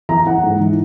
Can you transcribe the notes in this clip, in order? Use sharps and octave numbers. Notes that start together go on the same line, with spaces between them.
E3 A#5
E3 F#5
G#2
E3